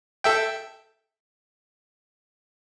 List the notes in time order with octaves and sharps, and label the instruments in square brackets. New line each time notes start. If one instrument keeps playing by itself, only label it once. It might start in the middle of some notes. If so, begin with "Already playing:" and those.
[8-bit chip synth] A4 E5 G5